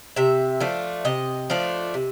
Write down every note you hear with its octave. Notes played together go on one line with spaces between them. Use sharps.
C3 E5
F3 A3 D4
C3 D#5
F3 A3 D4
C3